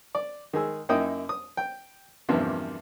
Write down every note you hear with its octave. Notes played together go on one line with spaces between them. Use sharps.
D5
D#3 G#3 G#4 E6
F#2 A#3 D#4 E4 G5 D#6
D#6
G5
E2 G2 C3 D#3 F3 A#3